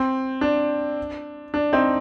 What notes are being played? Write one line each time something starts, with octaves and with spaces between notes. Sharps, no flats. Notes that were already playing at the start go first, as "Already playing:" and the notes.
Already playing: C4
D4
D4
C4 D#4